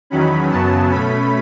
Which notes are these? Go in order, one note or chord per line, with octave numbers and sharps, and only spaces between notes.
E2 D#3 F#3 C#4 B5
F#2 C#3 F#3 B3 A5
B2 A3 C#4 B5